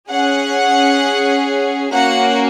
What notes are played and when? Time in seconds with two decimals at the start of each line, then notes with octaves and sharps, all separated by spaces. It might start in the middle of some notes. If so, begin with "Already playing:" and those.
0.11 C#4 G#4 F#5
1.92 A#3 C#4 F#4 F#5